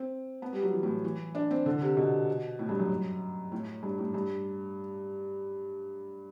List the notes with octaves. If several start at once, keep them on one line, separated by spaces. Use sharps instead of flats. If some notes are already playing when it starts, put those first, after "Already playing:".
Already playing: C4
B3
G3
F#3
E3
A2
E3
D4
C4
D3
C3
B2
A2
G2
F#2
A2
G2
A2
G2